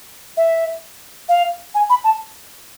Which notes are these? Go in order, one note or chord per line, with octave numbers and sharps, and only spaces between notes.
E5
F5
G#5
B5
A5